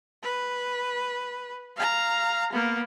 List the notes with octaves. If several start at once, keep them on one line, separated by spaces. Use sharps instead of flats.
B4
F5 A#5
A#3 B3